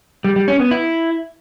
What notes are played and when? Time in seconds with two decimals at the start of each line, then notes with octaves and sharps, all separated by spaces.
0.24 G3
0.36 G3
0.48 C#4
0.60 B3
0.71 E4